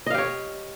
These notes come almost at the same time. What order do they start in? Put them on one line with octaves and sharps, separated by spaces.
D#5 F5 G4 C#5